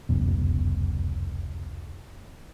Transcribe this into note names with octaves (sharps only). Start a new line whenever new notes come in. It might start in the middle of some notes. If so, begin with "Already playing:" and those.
F1 C#2 F#2 B2